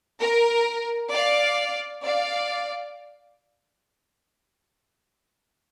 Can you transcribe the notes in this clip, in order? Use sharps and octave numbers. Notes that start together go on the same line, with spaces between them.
A#4
D5 F5
D5 F5